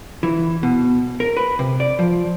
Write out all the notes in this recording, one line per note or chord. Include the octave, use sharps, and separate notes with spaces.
E3
B2
A#4
B4
C3
D5
F3